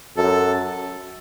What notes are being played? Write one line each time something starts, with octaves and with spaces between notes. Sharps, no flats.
F#2 A4